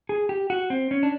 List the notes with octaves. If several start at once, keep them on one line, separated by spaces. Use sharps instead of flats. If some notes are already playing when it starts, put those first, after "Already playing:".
G#4
G4
F#4
C4
C#4
D4